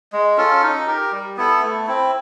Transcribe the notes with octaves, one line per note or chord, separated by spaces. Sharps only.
G#3
C#4 F4 A4
D#4
G4 A#4
G3
B3 E4 A4
A3
C4 E4